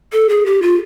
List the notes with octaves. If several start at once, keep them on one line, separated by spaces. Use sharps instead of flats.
A4
G#4
G4
F4